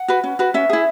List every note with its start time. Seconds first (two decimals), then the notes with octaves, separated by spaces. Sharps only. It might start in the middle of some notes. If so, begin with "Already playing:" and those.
Already playing: F#5
0.08 F#4 B4
0.23 C#4
0.39 F#4 B4
0.54 C#4 E5
0.69 E4 G#4